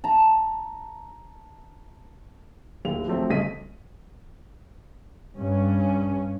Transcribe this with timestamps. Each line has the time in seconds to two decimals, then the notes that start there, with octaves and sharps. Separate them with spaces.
0.04 A5 A#5
2.85 D1 D#2 F7
3.08 F3 F#3 A3 C4
3.30 D#1 G2 C#3 D#5 B6 D#7
5.36 G2 C#4